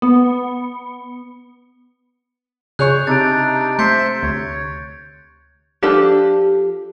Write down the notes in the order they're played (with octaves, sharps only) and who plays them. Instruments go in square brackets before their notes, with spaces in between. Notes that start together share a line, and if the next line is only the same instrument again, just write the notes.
[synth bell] B3
[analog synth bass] C#3 [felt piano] G#4 C#5 C#6 [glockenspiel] F#6 G6 F7
[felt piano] C3 [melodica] D4 D#4 [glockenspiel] A6 D7
[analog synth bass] A3 [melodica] C5 E5 C6 [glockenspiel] G6 C#7
[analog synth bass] D2 [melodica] C#5
[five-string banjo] F3 D4 A4 [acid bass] G4